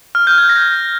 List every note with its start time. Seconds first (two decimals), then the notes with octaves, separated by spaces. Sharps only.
0.15 F6
0.27 G6
0.38 G#6
0.49 A#6